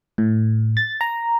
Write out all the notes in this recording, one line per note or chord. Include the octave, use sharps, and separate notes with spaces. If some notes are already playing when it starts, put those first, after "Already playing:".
A2
A6
A#5